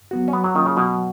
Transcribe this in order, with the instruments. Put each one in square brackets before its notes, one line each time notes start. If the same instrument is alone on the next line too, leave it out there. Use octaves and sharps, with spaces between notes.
[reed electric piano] F#3 B3 F#4
[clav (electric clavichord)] C#4
[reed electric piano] F#3 [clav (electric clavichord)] B3
[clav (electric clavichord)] F#3
[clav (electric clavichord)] D#3 [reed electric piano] A#3 C#4 F4
[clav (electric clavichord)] C#3
[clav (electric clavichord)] B2 [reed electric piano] F#3